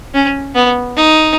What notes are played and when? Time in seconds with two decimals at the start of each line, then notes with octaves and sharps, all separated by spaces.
0.14 C#4
0.55 B3
0.97 D#4